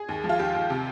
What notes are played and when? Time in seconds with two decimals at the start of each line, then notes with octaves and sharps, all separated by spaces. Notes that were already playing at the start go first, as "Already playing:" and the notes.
Already playing: G#4
0.09 D#2
0.24 F3
0.29 F4
0.39 D#2 G4
0.55 D#2
0.70 C3